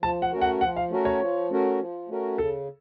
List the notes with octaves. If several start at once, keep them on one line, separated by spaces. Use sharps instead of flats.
F3 A5
F#5
A3 C#4 F#4 A#4
F#5
F3 F#5
F5
A3 C#4 F#4 A#4
C#5
F3
A3 C#4 F#4 A#4
F3
A3 C#4 F#4 A#4
C#3 A4